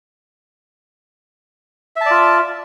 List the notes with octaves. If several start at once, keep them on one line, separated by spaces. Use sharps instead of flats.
F4 D5 E5 A5